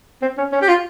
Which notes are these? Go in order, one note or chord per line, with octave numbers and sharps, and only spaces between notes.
C4
C#4
C#4
G4
F4